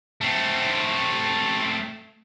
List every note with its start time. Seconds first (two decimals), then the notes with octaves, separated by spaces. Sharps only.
0.21 A3 C4